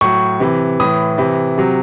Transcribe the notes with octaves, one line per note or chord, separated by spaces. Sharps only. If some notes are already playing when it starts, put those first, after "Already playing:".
A2 F#3 C#6
C3 E3
A2 E3 D#6
C3 E3
C3 F#3